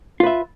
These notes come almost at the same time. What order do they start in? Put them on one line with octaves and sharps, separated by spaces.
F4 B4 E5